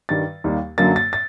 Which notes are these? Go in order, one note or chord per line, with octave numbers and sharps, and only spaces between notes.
G2 D#3 G3 A6
D#2 D#3 G3 A#3
F#2 D3 F#3 A#3 A6
A6
A6